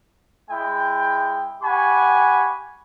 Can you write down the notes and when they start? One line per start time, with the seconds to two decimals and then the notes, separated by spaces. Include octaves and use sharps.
0.49 G#3 E4 G5
1.62 G4 F#5 G#5 B5 C#6